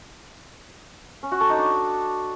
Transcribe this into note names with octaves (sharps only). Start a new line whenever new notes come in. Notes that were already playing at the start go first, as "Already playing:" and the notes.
C#4
F#4
A4
D#4
D4